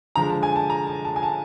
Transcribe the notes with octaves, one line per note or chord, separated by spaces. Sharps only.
D3 F3 G#3 A#5
A5
G#5
A5
A#5
A5
A5
G#5
A5